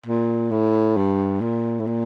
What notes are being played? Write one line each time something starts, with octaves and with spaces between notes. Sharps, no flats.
A#2
A2
G2
A#2
A2
A#2